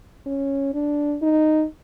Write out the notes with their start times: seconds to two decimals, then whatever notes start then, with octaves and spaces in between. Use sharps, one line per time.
0.26 C#4
0.73 D4
1.22 D#4